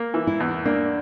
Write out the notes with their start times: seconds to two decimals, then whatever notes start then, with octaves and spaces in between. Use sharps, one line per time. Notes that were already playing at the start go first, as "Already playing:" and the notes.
Already playing: A#3
0.14 E3
0.27 E4
0.40 E2
0.65 A#3 D4